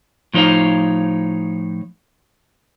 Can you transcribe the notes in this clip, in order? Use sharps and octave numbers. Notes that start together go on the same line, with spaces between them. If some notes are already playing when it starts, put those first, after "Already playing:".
A2 F3 D#4 B4 C#5 F5